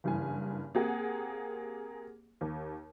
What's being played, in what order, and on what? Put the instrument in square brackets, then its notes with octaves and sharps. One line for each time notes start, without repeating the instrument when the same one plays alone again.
[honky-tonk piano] F#1 G2 E3 G#5
A#3 C4 G4 G#4 F#5
D#2